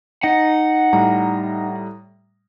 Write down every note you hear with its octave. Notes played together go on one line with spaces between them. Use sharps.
D#4 F#5
A2 G3 A#5